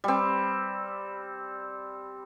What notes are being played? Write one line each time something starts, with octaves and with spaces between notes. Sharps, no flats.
G3 C4